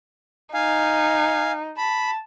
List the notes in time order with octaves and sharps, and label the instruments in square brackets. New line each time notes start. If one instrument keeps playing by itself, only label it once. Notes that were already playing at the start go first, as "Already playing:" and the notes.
[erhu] D#4 [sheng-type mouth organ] F5 G#5
[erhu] A5 [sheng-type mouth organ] B5